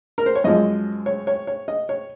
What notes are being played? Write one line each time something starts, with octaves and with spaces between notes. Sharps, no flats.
A#4
C5
C#5
F#2 F3 G#3 D#5
C#5
C#5
C#5
D#5
C#5